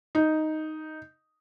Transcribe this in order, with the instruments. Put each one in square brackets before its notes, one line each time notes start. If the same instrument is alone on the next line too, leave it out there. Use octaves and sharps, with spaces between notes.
[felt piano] D#4